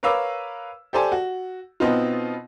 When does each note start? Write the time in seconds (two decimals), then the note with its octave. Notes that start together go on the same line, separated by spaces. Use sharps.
0.03 A#4 B4 C#5 F5 D6 E6
0.93 G4 A4 C5 D5 G#5 A5
1.12 F#4
1.80 B2 B3 C4 D#4 F4